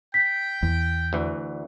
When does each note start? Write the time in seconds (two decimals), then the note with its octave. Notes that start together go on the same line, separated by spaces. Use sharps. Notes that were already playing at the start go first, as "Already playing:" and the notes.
0.14 G5 B6
0.63 E2
1.13 D2 E3